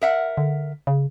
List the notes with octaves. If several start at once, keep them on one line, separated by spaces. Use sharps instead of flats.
A#4 E5 F#5
D3
C#3